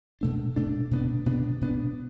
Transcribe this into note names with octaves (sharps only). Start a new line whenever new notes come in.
B2 A3 D4
B2 A3 D4
B2 B3 D4
B2 B3 D4
B2 B3 D4